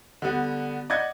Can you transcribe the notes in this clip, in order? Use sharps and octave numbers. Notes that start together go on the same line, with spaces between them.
D3 G3 B3
D5 D#5 F#5 G#6